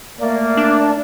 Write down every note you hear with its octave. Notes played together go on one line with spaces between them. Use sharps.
A3 A#3 D5
D4